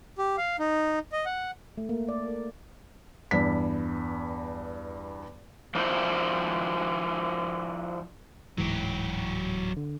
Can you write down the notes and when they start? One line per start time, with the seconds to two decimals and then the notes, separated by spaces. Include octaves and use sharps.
0.18 G4
0.37 F5
0.59 D#4
1.12 D#5
1.26 F#5
1.78 A3
1.89 A#3
2.09 D5
2.26 A#4
3.31 E2 G2 B6
5.75 F3 D4 E4 C5
8.58 D1 G#2 E3 F#3 G4
9.77 D3